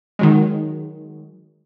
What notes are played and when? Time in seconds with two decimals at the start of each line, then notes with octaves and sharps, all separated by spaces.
0.19 D#3 F#3 G#3